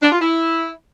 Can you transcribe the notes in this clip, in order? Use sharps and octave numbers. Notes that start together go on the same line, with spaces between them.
D4
F4
E4